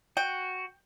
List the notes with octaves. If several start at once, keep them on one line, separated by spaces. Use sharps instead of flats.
F#4 G5